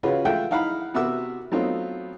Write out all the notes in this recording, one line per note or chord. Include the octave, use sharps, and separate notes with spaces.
C#3 C#4 F4 F#4 B4
G#3 A3 F4 E5 F#5 G5
D#4 E4 F5 F#5 A#5 B5
C3 B3 F#4 E5 D6 E6
F#3 A3 B3 C4 D#4 F4